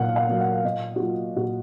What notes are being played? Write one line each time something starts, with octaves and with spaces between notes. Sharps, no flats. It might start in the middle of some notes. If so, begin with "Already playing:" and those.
Already playing: A#2 F#3 A#3 F5 F#5
F5
F#3 A#3
F#5
A#2 D#5
F#4
F#3 A#3 F4
A#2 F#4